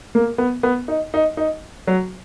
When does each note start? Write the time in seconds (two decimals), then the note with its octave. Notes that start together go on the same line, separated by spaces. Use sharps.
0.15 A#3
0.38 B3
0.63 B3
0.88 D#4
1.14 D#4
1.37 D#4
1.87 F#3